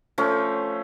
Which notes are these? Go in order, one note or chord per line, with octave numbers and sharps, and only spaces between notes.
F3 A3 C#4